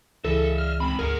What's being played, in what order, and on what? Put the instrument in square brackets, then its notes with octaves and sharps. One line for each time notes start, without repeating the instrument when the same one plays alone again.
[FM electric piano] C#2 E3 G#4 [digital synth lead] A4 [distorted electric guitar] D#5 E5
[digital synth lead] F6
[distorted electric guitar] G#3 C4 [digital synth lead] B5
[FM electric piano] G#1 D2 [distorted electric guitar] G#4 F#5 [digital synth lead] A#4